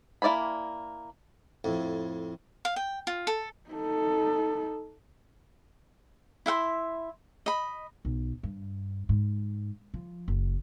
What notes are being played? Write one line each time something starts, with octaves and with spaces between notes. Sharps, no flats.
A#3 E4 D5 G#5 B5
F2 A2
F5
G5
F4
A4
D#4 A4
E4 E5 F#5 C6
D#5 B5
B1
G2
G#2
F3
F#1